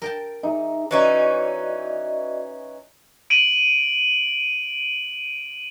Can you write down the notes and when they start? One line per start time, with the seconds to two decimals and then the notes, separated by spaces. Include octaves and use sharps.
0.02 A#4 G5 A5
0.43 D#4 G#4 E5
0.91 E3 C#4 D#4 F#4 D5 D#5
3.30 D7 D#7 F#7